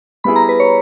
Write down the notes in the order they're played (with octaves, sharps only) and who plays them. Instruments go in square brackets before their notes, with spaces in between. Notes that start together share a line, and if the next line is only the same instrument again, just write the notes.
[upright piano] G3 B3 E4 G#4 [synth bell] B5
[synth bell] A#5
B4
C#5